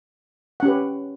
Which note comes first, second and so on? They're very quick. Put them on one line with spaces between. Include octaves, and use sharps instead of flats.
F#5 C#4 G4 B4